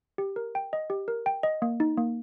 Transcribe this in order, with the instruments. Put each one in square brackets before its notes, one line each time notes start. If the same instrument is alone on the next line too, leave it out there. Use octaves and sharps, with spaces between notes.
[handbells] G4
A#4
G5
D#5
G4
A#4
G5
D#5
A#3
D#4
A#3